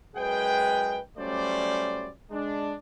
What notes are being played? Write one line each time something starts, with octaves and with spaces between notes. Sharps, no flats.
F#2 G#3 G#4 B4 G5
F#3 G3 A3 C#4 C5 D5
G#3 D4